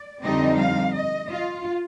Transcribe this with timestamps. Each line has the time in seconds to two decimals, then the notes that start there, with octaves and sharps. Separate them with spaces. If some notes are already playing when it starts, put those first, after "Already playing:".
Already playing: D5
0.23 F2 D3 G3 C4 D#4 D#5
0.59 F5
0.95 D#5
1.30 F4